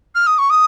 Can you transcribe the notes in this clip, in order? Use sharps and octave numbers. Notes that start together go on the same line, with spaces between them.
F6
D#6
C#6
D#6